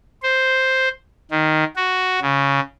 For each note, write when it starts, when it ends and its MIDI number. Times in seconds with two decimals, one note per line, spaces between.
0.23 0.88 72
1.31 1.64 51
1.76 2.19 66
2.21 2.60 49